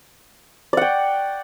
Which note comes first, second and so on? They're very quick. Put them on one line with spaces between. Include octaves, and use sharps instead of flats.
D5 F#5 G5